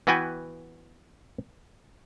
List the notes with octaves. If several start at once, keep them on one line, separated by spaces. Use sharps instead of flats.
E3 B3 F#4 B4 G5 G#5